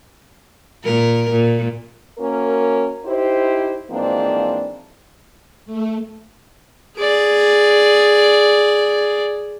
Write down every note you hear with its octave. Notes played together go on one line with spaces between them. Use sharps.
A#2 A#4
A#2
A#3 C#4 F#4 A#4
D#4 E4 G4 C5
G#2 E3 F3 A#3 C4 D4
A3
G#4 D5